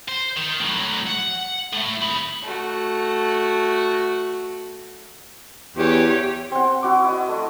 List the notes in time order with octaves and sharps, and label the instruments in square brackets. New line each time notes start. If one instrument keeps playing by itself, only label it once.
[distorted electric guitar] C5
D#3
A2 F#3
F#5
A2 A3
G#4 B5
[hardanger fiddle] A3 F#4
[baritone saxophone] E2 [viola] G4 C#5
[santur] C4 F#5
E4 F#4 D6
E4 D#5
A3 D#5